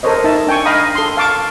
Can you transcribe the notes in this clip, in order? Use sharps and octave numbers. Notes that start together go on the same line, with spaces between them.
A4 A#4 C5 C#5 D#5
D#4 E5 A5
D4 G5 G#5 C#6
D#5 F5 G5 A#5 B5 D#6
A4 C6
F5 A5 C#6 D6